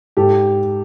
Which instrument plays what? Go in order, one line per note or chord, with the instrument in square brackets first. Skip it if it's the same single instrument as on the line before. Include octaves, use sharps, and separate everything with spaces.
[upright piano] G#2 G4 A4